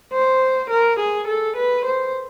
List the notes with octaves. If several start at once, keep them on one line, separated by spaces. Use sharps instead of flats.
C5
A#4
G#4
A4
B4
C5